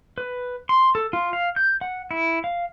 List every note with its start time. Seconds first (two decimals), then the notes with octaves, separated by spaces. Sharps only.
0.18 B4
0.69 C6
0.95 A4
1.13 F4
1.33 F5
1.56 G6
1.81 F#5
2.11 E4
2.44 F5